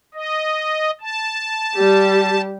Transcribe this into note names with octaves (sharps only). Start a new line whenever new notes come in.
D#5
A5
G3 G4